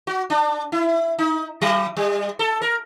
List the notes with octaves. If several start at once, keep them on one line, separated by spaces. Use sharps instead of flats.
F#4
D4
E4
D#4
F#3
G3
A4
A#4